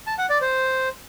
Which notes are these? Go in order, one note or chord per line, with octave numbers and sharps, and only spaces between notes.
A5
F#5
D5
C5